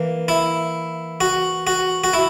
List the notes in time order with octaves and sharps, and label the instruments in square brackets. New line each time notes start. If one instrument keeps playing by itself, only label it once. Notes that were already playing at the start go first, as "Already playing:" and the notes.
Already playing: [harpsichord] E3 A#3
E4
F#4
F#4
F#4
E4